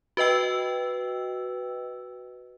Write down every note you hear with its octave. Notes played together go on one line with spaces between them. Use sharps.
F#4 B4 D#5 G5 E6